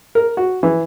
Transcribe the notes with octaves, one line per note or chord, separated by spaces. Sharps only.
A#4
F#4
E3